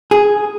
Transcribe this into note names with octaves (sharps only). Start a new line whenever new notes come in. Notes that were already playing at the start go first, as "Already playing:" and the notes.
G#4